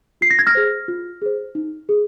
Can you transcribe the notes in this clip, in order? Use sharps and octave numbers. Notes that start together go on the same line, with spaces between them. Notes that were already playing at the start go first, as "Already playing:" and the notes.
F4 C7
A#6
G#6
F6 A#6
G#4 C5
F4
G#4 C5
D#4
G#4